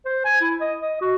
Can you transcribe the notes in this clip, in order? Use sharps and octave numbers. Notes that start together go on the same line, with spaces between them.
C5
G#5
E4
D#5
D#5
F#4